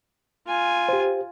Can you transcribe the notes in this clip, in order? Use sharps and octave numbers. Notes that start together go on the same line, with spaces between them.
F4 G#5
G4 C5